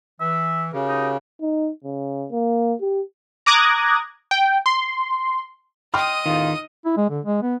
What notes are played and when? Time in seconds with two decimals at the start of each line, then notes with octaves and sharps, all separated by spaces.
0.20 E3 E5
0.73 C#3 F#4 G4 A#4
0.88 D#4
1.41 D#4
1.84 C#3
2.32 A#3
2.81 G4
3.46 A#5 D6 D#6 F#6 G#6 A#6
4.31 G5
4.66 C6
5.94 D#5 G5 C6 D#6 F6
6.26 A1 E2 D#3 F4
6.85 E4
6.97 G#3
7.10 D3
7.26 G#3
7.42 B3